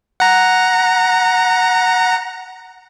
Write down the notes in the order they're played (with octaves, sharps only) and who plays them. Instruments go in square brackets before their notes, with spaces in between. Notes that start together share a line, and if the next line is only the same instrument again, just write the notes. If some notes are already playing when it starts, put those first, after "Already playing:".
[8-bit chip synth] F#5 A#5